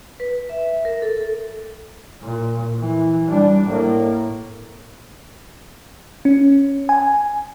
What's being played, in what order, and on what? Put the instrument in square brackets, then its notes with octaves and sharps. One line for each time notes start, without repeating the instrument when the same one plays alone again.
[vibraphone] B4
E5
A#4
A4
[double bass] A#2
E3
G3 D4
A2 A#3
[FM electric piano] C#4
G#5